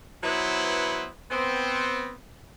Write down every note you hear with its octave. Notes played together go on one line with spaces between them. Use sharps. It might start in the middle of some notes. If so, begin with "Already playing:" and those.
F#3 B3 E4 B4 C5
B3 C4